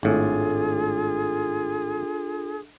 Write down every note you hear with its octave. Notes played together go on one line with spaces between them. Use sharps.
G#1 A2 D4 F4 G#4 A4